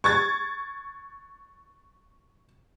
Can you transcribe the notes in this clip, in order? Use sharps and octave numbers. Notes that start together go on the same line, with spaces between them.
C#6 G#6 A6